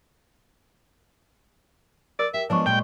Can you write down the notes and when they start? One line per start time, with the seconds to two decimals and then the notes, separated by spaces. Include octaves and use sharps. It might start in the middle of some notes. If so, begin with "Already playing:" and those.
2.19 A#4 D5
2.34 G4 E5
2.50 F3 G#3 B3 D4 C5 C#5 C#6
2.66 A#2 G3 G#3 G5